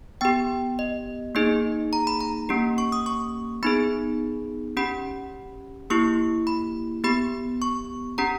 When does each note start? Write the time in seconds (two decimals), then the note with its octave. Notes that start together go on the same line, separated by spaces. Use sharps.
0.21 B3 G4 G5
0.79 D#5
1.35 A#3 D#4 G#4 D#5
1.93 A#5
2.07 B5
2.20 A#5
2.49 A#3 C#4 G4
2.78 C#6
2.92 D#6
3.06 C#6
3.63 B3 D#4 G#4 B5
4.77 C#4 G4 B5
5.90 A#3 E4 G4 C#6
6.47 B5
7.04 B3 G4 B5
7.62 C#6
8.18 C#4 G4 A#5